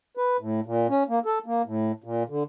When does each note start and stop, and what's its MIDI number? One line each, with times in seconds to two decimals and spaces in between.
0.17 0.37 71
0.39 0.60 45
0.66 0.87 46
0.90 1.03 61
1.09 1.19 58
1.26 1.39 69
1.46 1.62 58
1.65 1.92 45
2.04 2.23 46
2.29 2.43 50